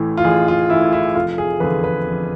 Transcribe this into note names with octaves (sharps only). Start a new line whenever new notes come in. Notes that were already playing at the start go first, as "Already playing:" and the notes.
Already playing: A1 A2 E3
F4
A1 G#4
F4
A2 E3 E4
E4
F1 F4
G#4
E2 D3 F3 B4
B4
F1